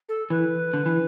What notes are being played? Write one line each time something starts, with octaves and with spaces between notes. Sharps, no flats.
A4
E3 B4
D3
E3